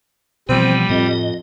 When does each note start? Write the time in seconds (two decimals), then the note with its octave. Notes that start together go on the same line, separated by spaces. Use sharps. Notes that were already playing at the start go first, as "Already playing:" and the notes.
0.49 B2 E3 F3 G3 B3 C4
0.89 F2 A2 C4 D#5